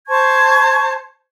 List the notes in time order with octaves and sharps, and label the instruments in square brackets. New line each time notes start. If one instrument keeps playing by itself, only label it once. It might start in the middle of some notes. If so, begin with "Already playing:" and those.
[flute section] C5 A5 C#6 G#6